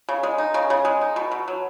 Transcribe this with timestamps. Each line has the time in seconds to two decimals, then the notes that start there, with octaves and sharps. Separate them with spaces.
0.09 C#3
0.23 G#3
0.38 D#4
0.54 C#3
0.70 C#3
0.85 G#3
1.01 D#4
1.16 B2
1.32 B2
1.48 F#3